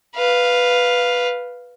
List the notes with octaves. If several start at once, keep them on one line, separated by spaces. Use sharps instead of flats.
B4 F5